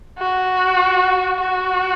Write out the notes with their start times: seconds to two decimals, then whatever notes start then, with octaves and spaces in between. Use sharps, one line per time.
0.19 F#4
1.39 F#4